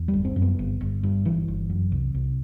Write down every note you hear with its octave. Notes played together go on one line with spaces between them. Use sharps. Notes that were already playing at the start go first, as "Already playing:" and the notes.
Already playing: E2
G3
G1
C4
F#2
B3
G1
G1
G2
G1 E3
G1
F#2
C2
C2